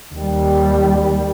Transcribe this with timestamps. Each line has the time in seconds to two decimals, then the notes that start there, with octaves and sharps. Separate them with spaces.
0.14 D#2 G3